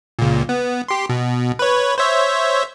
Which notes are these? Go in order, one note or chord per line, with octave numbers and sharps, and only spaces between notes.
C#2 A#2
B3
G4 C6
B2
B4 C#5
C5 C#5 E5